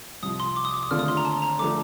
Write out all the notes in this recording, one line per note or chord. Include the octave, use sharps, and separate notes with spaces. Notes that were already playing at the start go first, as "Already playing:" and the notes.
C2 C3 F3 D#6
C6
D6
D#6
D6
D#6
D#2 D3 A3 C4 F4 F6
D#6
C6
A#5
A5
A#5
D3 F3 A3 D6